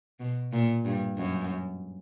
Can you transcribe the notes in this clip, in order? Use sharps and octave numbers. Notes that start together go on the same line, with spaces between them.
B2
A#2
G2
F#2